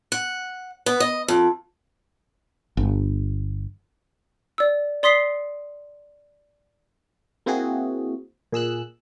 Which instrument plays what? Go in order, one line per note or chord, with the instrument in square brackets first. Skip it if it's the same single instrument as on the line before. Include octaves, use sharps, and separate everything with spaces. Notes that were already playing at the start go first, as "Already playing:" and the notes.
[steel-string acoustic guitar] F#5
B3
D#5
F2
[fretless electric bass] G1
[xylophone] D5 E6
D5 C6 D#6 B6 C7 G7
[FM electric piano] A#3 C4 E4 F#4 G#4
A#2 G#4 E6 F#6